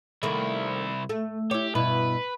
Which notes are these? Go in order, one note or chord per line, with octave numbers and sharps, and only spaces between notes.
C2 D#3 A3 A#3 E4
A3
E4 G4 C#5
G2 B2 E4 B4